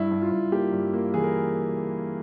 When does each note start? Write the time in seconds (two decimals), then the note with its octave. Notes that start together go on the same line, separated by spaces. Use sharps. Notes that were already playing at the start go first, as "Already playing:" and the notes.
Already playing: G2 E4
0.11 G2
0.22 F4
0.32 G2
0.52 A#3 G4
0.73 G2
0.93 A#3
1.14 E3 G#4
1.24 A#4